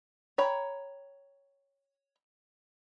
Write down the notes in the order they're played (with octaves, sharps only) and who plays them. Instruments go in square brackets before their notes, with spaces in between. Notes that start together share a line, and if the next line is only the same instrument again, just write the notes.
[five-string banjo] C#5 G5 A#5 B5